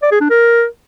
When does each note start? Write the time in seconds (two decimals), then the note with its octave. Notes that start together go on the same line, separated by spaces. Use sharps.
0.02 D5
0.12 G#4
0.21 D4
0.30 A#4